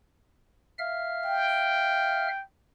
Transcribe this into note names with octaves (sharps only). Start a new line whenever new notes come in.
E5 F5 F6
G5